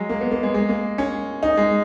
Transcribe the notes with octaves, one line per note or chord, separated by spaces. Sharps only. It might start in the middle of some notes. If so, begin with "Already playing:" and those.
Already playing: F#3 G#3
A#3
B3
A#3
G#3
G#3
A#3
C#4
D#4
G#3